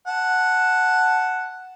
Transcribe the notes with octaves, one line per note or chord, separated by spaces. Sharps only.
F#5 A5